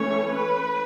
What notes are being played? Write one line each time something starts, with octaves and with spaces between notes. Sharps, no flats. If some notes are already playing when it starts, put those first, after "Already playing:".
Already playing: E3 A3 C#4 C#5
B4